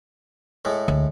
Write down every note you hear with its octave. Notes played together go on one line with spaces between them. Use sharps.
A2 G#3 A3
D2